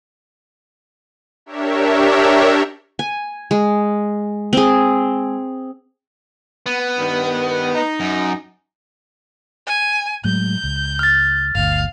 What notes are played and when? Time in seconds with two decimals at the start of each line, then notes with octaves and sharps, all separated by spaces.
1.46 D4 G4 A#4 C#5 E5
2.99 G#5
3.51 G#3
4.53 C4 G#4
6.66 B3
6.98 G2 D#3
7.75 D#4
8.00 F#2
9.67 G#5
10.24 A2 F#3 G#3 G6
10.64 C#2
10.99 F6 A6
11.55 G1 D2 F5